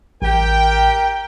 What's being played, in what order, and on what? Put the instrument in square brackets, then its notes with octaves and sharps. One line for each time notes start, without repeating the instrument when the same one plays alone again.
[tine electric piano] A1 [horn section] G4 A#4 G5